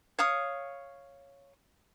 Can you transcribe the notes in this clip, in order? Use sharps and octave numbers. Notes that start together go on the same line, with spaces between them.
C#5 F5 D#6